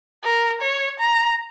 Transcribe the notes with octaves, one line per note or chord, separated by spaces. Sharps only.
A#4
C#5
A#5